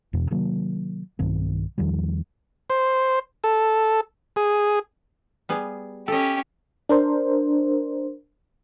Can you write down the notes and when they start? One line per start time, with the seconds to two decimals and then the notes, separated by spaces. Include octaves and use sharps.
0.13 E2 B2
0.31 C3 D#3 F#3 A#3
1.19 B1 G2 D#3 C4
1.78 E2 D#3 F3 G3
2.70 C5
3.44 A4
4.36 G#4
5.49 G3 B3 G#4
6.08 C#4 G4 A4 D#5
6.89 D4 A#4 C5